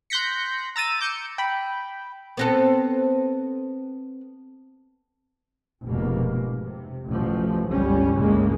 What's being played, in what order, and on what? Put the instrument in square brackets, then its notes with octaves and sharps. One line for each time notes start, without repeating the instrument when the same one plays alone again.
[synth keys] C6 F#6 G6 A#6 B6 C#7
A#5 E6 A6 D#7
D6 G6 C#7 E7
G5 B5
[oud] B3 C4 A4
[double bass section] F1 G#2 B2 A#3
C3
A1 F#2 F3
G1 C#2 G3 C#4
G1 C#2 A2 C#3 G#3 A#3